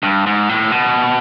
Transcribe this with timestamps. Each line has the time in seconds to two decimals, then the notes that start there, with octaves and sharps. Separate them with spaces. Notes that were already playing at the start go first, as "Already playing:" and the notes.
0.03 G2
0.26 G#2
0.49 A2
0.72 B2